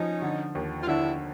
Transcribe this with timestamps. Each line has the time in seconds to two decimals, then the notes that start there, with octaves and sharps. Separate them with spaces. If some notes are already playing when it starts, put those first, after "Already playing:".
Already playing: F3 C#4 D#4
0.22 D3
0.55 D#2
0.82 F4
0.87 D3 D4 E4